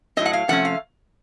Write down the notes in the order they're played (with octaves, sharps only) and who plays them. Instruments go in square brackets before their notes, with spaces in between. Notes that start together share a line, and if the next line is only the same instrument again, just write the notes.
[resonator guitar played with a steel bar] A2 F#3 C4 D#5
F#5
F5
C3 F3 A3 C#4 F#5
F5